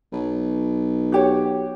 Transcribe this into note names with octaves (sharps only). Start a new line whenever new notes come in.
B1
F#4 G4 C#5